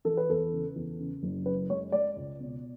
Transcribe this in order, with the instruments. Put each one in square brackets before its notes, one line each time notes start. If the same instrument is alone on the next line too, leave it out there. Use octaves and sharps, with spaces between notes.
[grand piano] E3 A4
B4
E2 A4
C#3
E2
C#3
F#1
F#2 B4
G#3 C#5
G#3 D5
C#2
B2